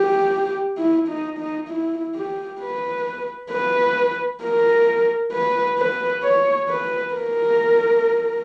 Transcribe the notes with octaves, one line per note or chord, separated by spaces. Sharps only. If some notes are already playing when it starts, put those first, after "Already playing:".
Already playing: G4
E4
D#4
D#4
E4
G4
B4
B4
A#4
B4
B4
C#5
B4
A#4